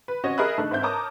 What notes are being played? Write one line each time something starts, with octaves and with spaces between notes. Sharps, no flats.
B4
C4 C#4 F#4 C#5 D#5
G#4 A#4 D#5 E5 B5 F#6
A3 D4 D#4 A4
G#2 C4 E5 G6
A#4 C#5 A5 A#5 D6 D#6